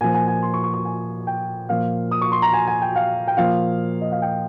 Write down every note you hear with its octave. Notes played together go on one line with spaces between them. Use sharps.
A#2 F3 G#5
G#5
G#5
C6
C#6
C#6
C#6
G#5
G5
A#2 F3 F5
D#6
C#6
C6
A#5
G#5
G#5
G5
F5
G5
A#2 F3 F5
D#5
F5
G5